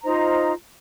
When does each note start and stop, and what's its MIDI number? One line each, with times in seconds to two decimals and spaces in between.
0.04 0.52 63
0.04 0.52 65
0.04 0.52 72
0.04 0.52 82